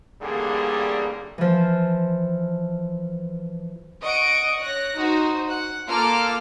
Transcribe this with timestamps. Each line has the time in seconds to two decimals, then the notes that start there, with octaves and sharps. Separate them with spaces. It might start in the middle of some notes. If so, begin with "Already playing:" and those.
0.22 A1 D3 G3 A#3 G#4
1.38 E3 F3
4.02 D#5 F#5 C#6 D7
4.61 C#5 F#6 A#6
4.96 D#4 F#4 C5
5.49 F#5 F#6
5.88 A#3 F4 A4 D6 F6